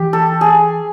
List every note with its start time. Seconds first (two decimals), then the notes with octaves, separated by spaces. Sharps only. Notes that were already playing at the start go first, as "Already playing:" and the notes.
Already playing: E3 G4
0.13 A4
0.41 G#4